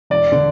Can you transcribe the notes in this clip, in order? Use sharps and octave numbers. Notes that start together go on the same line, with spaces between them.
E1 D5
D3